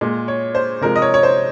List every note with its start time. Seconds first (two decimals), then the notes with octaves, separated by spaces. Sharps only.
0.01 A#2 G#3
0.28 C#5
0.55 C5
0.81 C3 F3 G#3 A#4
0.96 D#5
1.02 C#5
1.14 C#5
1.23 C5